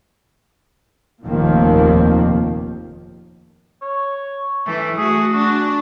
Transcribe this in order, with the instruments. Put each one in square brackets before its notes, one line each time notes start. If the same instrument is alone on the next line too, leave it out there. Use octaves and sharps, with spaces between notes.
[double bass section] F1 D#2 A#2 D#3 F3 A#3
[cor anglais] C#5
[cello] E3 [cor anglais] A3
[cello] A3 F#4 [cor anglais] G#4
[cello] D4 [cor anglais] F#4